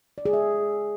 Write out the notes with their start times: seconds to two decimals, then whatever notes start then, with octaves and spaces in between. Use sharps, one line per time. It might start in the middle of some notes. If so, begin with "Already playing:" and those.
0.18 D5
0.25 G#4
0.33 E5